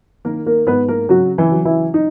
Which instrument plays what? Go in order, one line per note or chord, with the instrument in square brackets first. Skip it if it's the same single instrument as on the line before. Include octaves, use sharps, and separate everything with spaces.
[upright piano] D#3 A#3 A#4
A#3 A#4
G#2 B3 B4
A#3 A#4
C#3 F#3 F#4
E3 E4
F#3
E3 E4
D#4